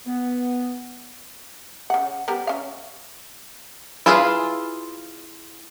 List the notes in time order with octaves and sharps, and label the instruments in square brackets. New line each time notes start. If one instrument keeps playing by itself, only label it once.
[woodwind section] B3
[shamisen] C#3 F#5
G3 B3 A#4
C#4 F5
[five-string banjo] E4 F4 G#4 B4 F5